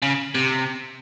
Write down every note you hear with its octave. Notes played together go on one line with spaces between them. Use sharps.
C#3
C3